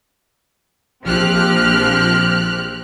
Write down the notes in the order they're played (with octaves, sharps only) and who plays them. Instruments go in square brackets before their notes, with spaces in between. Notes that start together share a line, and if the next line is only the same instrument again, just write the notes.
[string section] A#1 F3 C4 G4 F6 F#6